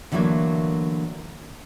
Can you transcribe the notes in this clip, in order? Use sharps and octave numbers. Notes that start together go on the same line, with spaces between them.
D3 E3 F#3 A3 A#3